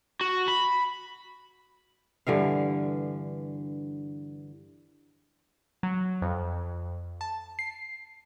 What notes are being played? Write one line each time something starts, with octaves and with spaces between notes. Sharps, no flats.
F#4
B5
G2 D3 E3 F5
F#3
F2
A5
C7